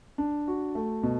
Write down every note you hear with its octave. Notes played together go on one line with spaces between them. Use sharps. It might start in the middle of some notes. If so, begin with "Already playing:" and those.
D4
F#4
A3
B2